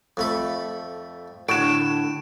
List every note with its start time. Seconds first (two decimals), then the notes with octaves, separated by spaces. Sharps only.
0.17 F2 A3 B5
1.49 A2 D3 F#4 A4 D7 E7